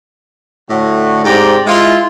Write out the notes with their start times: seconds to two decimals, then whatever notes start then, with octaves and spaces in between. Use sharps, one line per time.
0.70 A2 D3 F#4
1.24 G#2 C3 C4 G4 D5 A#5
1.66 G#3 E4 F4